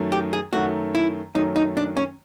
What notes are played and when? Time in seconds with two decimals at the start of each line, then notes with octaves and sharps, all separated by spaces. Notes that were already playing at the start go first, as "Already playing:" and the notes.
Already playing: F#2 D#3 F#3 A3
0.12 G4
0.33 G#4
0.53 F#2 D#3 F#3 A3 F#4
0.95 E4
1.35 F#2 D#3 F#3 A3 D#4
1.56 D#4
1.77 D4
1.97 C#4